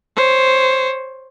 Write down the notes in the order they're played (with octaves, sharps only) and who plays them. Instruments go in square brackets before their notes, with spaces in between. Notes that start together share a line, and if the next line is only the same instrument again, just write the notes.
[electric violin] C5 C#5